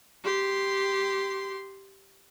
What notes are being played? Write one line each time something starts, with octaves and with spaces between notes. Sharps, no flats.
G4 C6